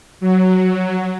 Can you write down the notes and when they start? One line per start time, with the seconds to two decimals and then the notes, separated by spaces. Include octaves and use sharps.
0.21 F#3